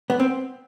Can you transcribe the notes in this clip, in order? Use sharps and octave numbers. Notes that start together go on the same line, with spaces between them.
B3
C4